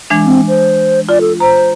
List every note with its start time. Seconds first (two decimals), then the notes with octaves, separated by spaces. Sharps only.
0.10 E3 G#3 D4
0.26 C4
0.48 C5
1.09 F4 D5
1.21 A4
1.40 C5 A#5